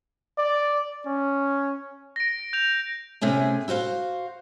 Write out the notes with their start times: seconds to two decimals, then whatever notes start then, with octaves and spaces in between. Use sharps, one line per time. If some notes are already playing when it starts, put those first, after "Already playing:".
0.38 D5
1.06 C#4
2.16 A#6 D7
2.53 G6 F7
3.21 C3 A3 C#4 G#4
3.68 E4 F#4 C5 F5